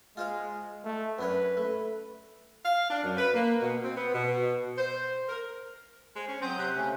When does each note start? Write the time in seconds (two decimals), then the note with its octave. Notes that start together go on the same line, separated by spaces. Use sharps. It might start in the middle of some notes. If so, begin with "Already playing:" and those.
0.17 G#3 F4 C5 F5
0.84 A3
1.19 F#2 D4 B4 C#5
1.57 A3
2.65 F5
2.90 D4
3.04 F#2
3.17 B4
3.34 A#3
3.61 B2
3.84 C4
3.97 B3
4.14 B2
4.78 C5
5.29 A#4
6.16 G#3 C5
6.28 C#4
6.42 F#3 C4 C6 D#6 G6
6.58 C3 F#6
6.76 C#3 A3 C#4